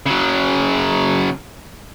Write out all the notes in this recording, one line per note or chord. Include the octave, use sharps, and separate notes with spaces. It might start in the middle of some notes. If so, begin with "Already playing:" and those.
C#3 F#3